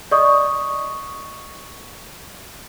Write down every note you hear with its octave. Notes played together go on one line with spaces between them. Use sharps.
D5 D#5 C#6 D#6